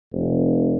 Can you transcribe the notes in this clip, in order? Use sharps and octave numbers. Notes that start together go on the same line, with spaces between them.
F1